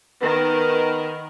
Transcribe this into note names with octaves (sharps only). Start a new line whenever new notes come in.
D#3 B3 A#4